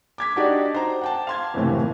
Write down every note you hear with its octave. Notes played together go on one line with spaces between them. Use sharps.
D6 G#6 B6
D4 D#4 F#4 G4 D5
C5 A#5
F#5 G5 A5
F5 C6 G#6
F#1 D#2 A2 C3 E3